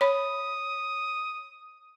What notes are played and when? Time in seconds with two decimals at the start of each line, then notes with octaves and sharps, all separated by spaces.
0.01 C#5 B5 D#6